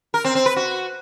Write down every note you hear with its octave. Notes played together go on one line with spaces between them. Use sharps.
A#4
C4
C4
B4
F#4